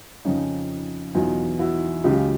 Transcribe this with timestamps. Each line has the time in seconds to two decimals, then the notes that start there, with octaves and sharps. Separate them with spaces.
0.25 F2 C#3 F3 C#4 D#4
1.15 E2 B2 F#3 D#4 F4
1.59 E4 F#4
2.04 C#2 C#3 F#3 F4 G4